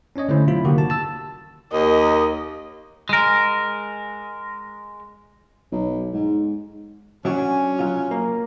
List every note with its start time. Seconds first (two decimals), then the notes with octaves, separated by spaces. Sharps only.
0.16 C#4 D4 C#5 D#5
0.28 D3 A3 C#4 E4 C5
0.47 C3 F#3 E4 F4 B5
0.64 D3 D#3 A#3 F#4 G4
0.78 A5
0.90 A5 E6
1.72 D#2 A#4 D#5
3.09 G#3 A#4
5.72 B1
6.13 G#2
7.25 F#3 C#4 D4 F#4 G#5
7.79 F#3 F4
8.11 A#3